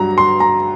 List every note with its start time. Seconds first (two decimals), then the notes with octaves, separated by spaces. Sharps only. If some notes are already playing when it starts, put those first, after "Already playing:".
Already playing: G2 F#3 A#5
0.18 C6
0.40 A#5